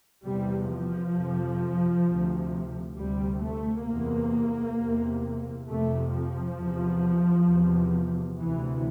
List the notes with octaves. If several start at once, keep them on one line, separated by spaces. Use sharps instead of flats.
E2 C3 G3
F3
F2 C3
D2 C3
D2 C3 G3
A3
E2 C3 A#3
E2 C3
F2 C3 A3
F3
E2 C3
E2 C3
D2 C3 E3